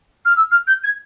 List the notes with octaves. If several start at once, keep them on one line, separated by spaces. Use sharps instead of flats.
F6
E6
F6
G6
G#6